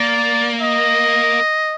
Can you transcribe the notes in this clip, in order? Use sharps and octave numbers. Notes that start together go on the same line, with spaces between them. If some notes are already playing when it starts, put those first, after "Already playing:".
Already playing: A#3 D5
D#5